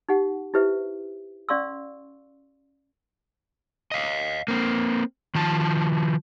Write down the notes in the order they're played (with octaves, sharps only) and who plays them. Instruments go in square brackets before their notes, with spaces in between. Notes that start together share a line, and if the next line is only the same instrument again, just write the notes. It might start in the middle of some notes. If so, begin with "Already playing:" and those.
[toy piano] D#4 G4 F#5
E4 G4 B4 C5 E5
C#4 D5 F5 C6 C#6 E6
[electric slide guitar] D#5 F5
A#3 C4
D#3 F3 A5